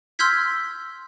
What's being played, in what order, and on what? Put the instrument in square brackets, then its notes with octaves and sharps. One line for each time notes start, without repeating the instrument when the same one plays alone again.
[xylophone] C6 E6 F6 G6 G#6 B6